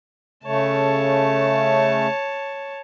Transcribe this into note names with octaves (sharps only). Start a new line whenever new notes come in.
C#3 A3 C#5 A5